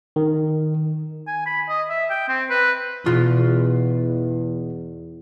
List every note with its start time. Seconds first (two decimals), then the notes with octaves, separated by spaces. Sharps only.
0.16 D#3
1.28 G#5
1.46 B5
1.69 D#5
1.90 E5
2.10 G5
2.29 C4
2.50 B4
3.06 E2 B2 F4 C6